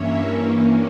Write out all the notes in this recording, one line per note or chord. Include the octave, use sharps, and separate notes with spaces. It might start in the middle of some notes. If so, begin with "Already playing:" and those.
Already playing: G2 E3 A#3 C#4 C#5 E5